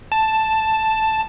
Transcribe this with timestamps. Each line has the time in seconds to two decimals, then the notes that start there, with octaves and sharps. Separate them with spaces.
0.12 A5